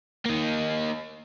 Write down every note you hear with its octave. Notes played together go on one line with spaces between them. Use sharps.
A#3 D#4